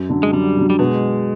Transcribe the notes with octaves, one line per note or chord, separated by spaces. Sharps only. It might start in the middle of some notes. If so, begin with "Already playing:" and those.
Already playing: F#2
D3 F#3
G#3
F#2 G3
D3 F#3
G3
B2 G#3